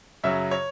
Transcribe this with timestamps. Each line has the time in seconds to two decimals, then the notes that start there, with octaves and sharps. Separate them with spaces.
0.24 F#2 C#3 F#3 C#4 E5
0.51 C#5